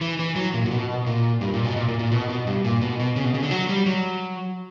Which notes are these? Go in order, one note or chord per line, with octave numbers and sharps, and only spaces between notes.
E3
E3
F#3
A#2
A#2
B2
A#2
G2
A#2
B2
A#2
A#2
A#2
B2
B2
G2
A#2
B2
B2
C#3
B2
C#3
D3
F#3
G3
F#3